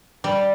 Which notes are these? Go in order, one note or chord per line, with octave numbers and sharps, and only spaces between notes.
G3